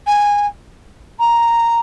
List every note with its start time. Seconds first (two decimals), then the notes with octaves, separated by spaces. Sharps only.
0.07 G#5
1.20 A#5